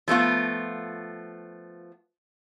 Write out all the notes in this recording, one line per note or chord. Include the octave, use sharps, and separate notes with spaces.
F3 A3 B3 F4